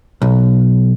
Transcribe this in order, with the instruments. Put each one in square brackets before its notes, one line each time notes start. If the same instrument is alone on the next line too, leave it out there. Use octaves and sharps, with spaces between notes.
[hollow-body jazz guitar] B1